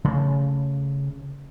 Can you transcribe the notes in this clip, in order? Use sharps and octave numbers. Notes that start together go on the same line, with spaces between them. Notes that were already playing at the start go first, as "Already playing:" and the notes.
C#3 A3